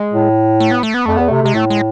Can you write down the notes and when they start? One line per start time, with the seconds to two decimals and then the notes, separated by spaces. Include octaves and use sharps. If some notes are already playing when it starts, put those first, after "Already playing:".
Already playing: G#3
0.13 A2
0.60 A3
0.71 B3
0.83 A3
0.94 B3
1.06 F2 A3
1.17 E2 B3
1.28 C3 A3
1.42 C3 G#3
1.54 A2 A3
1.70 G#3